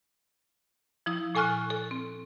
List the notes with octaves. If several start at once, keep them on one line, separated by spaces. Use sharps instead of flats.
F3 E4 D#6
A#2 A4 G#5 C#6 F6 F#6
A4
C4